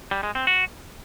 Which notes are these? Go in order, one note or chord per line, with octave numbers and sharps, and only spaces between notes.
G3
G#3
C4
F#4